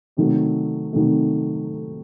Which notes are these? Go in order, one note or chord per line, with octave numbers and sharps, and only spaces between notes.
C3 D#3 F#3 A3
C3 D#3 F#3 A3